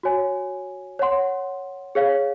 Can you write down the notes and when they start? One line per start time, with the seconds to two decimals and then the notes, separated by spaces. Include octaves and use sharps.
0.03 F#4 C#5 G#5
0.99 C#5 F#5 C6
1.95 G#4 C#5 F5